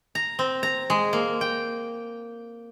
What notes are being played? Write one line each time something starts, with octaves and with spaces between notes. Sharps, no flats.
A#5
C4
A#5
G#3
A#3
G5